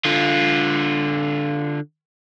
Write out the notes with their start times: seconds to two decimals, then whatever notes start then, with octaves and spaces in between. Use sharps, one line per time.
0.05 D3 F4